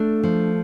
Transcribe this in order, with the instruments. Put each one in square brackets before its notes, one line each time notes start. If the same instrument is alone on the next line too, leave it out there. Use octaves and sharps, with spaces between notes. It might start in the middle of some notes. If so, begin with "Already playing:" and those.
Already playing: [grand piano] A3 A4 [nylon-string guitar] D4
[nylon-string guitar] F3